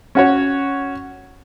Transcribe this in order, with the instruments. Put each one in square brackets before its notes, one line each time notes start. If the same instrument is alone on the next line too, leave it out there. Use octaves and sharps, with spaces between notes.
[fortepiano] C#4 F#4 C#5